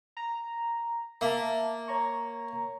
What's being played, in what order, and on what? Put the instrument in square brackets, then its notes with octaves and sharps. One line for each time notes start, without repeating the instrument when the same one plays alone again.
[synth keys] A#5
[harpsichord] A#3 [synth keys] E5 A5
[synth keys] C#5 A#5 C#6